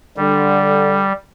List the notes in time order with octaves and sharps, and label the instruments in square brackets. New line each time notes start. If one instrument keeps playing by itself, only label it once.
[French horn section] D3 [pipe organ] G3